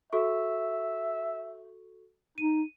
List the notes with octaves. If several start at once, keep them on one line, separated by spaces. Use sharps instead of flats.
F#4 A4 E5 C#6
D#4 D#7